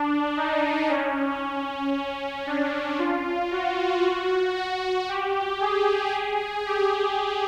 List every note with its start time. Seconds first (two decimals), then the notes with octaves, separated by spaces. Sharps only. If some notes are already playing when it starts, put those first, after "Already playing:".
Already playing: D4
0.37 D#4
0.89 C#4
1.41 C#4
1.94 C#4
2.47 D4
2.99 F4
3.51 F#4
4.03 F#4
4.56 F#4
5.09 G4
5.60 G#4
6.66 G4